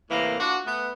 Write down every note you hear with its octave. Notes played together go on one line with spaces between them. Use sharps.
A2 C3 E3 A#3
D4 F4 F#4
A3 B3